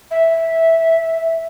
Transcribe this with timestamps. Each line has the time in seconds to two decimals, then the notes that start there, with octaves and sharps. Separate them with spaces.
0.11 E5